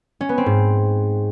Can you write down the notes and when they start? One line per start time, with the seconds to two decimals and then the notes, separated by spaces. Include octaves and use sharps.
0.21 C#4
0.29 B3
0.38 C4
0.46 G#2